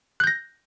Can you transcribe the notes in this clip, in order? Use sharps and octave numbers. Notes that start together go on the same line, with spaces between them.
F#6 G6 A#6